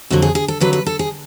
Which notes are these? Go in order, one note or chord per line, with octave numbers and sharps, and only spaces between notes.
F2 D3 F#3 F#4
G#4
G#4
A4
F2 D3 F#3 B4
B4
A4
G#4